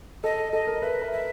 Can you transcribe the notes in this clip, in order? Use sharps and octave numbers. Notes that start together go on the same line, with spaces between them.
A4 D#5
A4 D#5
A#4
B4 E5
B4
E5